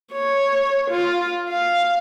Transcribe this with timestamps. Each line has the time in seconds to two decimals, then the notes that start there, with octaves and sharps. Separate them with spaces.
0.13 C#5
0.91 F4
1.49 F5